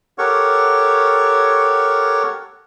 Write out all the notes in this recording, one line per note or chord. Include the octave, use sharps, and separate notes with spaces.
G4 A4 A#4 C#5 F#5 C#6